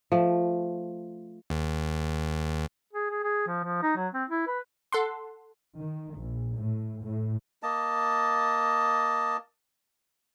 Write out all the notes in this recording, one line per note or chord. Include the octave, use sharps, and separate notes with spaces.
F3 A3
D#2
G#4
G#4
G#4
F3
F3
D#4
F#3
C4
E4
B4
A4 F#5 C6
D#3
A#1
A2
A2
A#3 D#5 A5